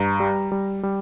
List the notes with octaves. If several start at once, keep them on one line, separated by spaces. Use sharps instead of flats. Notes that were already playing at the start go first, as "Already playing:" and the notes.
Already playing: G2 A#5
G3
G3
G3